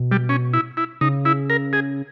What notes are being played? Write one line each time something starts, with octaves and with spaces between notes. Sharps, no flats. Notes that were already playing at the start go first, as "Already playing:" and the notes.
Already playing: B2
G3
C#4
E4
E4
C#3 D#4
E4
A#4
G#4